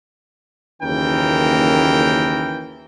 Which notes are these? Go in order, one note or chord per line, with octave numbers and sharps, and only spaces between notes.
F#1 D#2 E3 C#4 A#4 G5